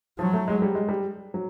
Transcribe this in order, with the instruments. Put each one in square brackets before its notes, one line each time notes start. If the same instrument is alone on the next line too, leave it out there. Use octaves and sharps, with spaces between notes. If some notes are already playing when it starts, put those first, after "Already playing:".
[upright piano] F3 [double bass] F#3
[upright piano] A3
G#3
G3
G#3
G3
F#3